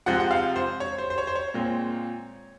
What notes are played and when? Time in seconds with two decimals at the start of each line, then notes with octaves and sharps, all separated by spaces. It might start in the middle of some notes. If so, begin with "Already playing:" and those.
0.06 C3 F3 G#3 C4 F#5
0.20 F#5
0.31 F5
0.56 C5
0.80 C#5
0.98 C5
1.10 C5
1.18 C#5
1.27 C5
1.35 C#5
1.54 A#2 G#3 C4